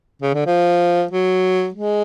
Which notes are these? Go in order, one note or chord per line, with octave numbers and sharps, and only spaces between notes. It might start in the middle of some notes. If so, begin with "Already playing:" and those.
C#3
D3
F3
F#3
G#3